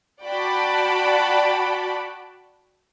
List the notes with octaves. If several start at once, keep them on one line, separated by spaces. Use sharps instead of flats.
F#4 D5 F#5 G5 A5 B5